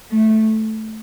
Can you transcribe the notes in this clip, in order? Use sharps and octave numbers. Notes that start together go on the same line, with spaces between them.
A3